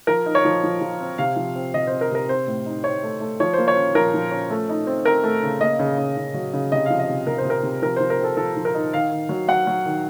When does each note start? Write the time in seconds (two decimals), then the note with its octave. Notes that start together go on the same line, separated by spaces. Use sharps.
0.07 F3 A#4
0.26 D#4
0.35 C#5
0.45 F3
0.64 F3
0.81 F3
1.00 C4
1.18 C3 F5
1.36 F3
1.56 C4
1.74 C3 D#5
1.87 C4 C5
2.01 A#4
2.11 C3 A#4
2.29 C4 C5
2.47 A2
2.66 D#4
2.84 C4 C#5
3.03 A3
3.21 A3
3.40 F3 C#5
3.53 A#3 C5
3.68 C#5
3.76 C#4
3.95 F3 A#4
4.14 F3
4.31 C#4
4.50 A3
4.69 D#4
4.87 C4
5.05 C4 A#4
5.23 A3
5.43 C#3
5.61 A#3 D#5
5.79 C#3
5.98 C#3
6.17 C#3
6.34 F#3
6.54 C#3
6.72 C3 D#5
6.86 F3 F5
6.99 D#5
7.09 C3
7.27 C3 A#4
7.38 C5
7.45 C3 A#4
7.63 C3
7.82 F3 A#4
7.96 F3 C5
8.10 A#4
8.20 C4 A4
8.37 F3 A4
8.57 F3
8.65 A#4
8.74 D#4
8.93 D#3 F5
9.12 D#3
9.29 F#3
9.48 F#3 F#5
9.67 F#3
9.85 D#3